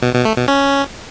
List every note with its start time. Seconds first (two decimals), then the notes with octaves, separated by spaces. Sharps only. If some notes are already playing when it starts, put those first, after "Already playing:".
0.02 B2
0.14 B2
0.25 A3
0.37 B2
0.48 C#4